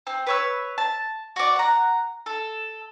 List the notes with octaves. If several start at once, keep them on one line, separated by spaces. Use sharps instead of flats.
C4
B4 C#5 E6
A5
F#4 D5
F#5 A#5
A4